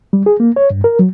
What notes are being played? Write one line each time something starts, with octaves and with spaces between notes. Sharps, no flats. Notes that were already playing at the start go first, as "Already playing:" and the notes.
G3
G#4
A#3
C#5
G2
A#4
F#3